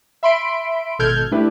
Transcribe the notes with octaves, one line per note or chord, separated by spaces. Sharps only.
E5 B5 C6 B6 D7
G#1 B2 A4 F6 G6 G#6
A3 D4 E4 G4 B4